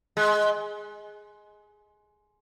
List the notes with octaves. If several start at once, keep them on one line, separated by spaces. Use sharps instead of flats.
G#3